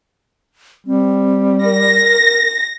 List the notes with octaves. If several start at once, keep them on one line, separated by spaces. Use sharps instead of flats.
G3 C4
A#4 A#6